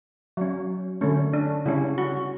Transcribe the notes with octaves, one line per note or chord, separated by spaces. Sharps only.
F#3 C#4
D3 A3 C#4
D4
C#3 G3 C#4 E4
F#4